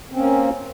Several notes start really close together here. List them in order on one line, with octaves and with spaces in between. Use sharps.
C4 C#4 A#3